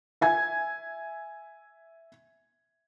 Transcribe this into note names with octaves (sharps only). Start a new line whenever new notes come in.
E5 G#5 G#6